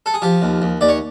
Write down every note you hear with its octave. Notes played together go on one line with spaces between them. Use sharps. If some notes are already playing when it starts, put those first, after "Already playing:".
A4
G#4
F3 G4
D#2
D#2
D#2 D5
C#5